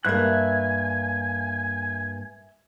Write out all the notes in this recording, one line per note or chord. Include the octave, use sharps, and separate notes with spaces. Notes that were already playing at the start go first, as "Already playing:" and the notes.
G2 A#3 E5 G#5 F#6